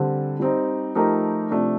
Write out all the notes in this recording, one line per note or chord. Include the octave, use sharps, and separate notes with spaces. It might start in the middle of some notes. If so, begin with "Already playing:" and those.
Already playing: D3 G3 C4
G3 C4 D#4
F3 A3 D#4 G4 A#4
C3 F3 A3 D4